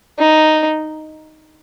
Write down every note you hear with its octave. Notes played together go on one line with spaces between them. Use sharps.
D#4